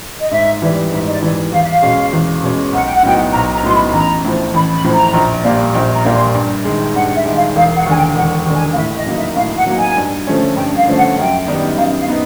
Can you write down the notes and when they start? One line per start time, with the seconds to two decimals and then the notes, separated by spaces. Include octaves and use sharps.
0.21 D#5
0.31 G#2 E5
0.62 E3 G3
0.92 G#2 E5
1.05 D#5
1.12 D5
1.23 E3 G3
1.53 E2 F5
1.63 E5
1.72 F5
1.82 B2 G#3 C#4
2.13 E2
2.43 B2 G#3 C#4
2.73 B1 F#5
2.84 G5
2.94 F#5
3.03 A2 F#3 B3 D#4 G5
3.17 F#5
3.33 B1 A#5
3.53 A#5
3.63 A2 F#3 B3 D#4 C6
3.74 B5
3.93 A1 A#5
4.24 A2 F3
4.54 A1 B5
4.75 B5
4.84 A2 F3
4.94 A#5
5.14 A#1
5.44 A#2 G3 A#3
5.75 A#1
5.94 A#5
6.05 A#2 G3 A#3
6.15 C6
6.35 G2
6.65 D#3 G#3
6.95 G2 F#5
7.16 E5
7.26 D#3 G#3
7.35 F5
7.56 E1 F5
7.75 F#5
7.86 D#2 D3 G#5
7.96 G5
8.15 E1 F#5
8.46 D#2 D3
8.56 G#5
8.73 F5
8.76 A2 E5
8.96 D#5
9.06 F#3 A#3 D#4
9.17 E5
9.36 A2 F5
9.57 F#5
9.66 F#3 A#3 D#4
9.77 G#5
9.97 G2
10.27 D3 F3 A3 C#4
10.56 G2 G5
10.77 F5
10.87 D3 F3 A3 C#4
10.97 F#5
11.18 F#2 G5
11.47 D#3 G3 B3 D#4
11.78 F#2 F5
11.98 F5
12.08 B3 D#4